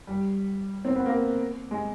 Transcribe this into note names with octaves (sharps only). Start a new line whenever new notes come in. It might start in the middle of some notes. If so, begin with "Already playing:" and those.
G3
C4
B3
A#3
G#3